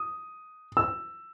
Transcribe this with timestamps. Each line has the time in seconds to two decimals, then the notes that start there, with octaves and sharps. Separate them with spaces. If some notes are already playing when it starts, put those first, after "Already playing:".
Already playing: D#6
0.77 E6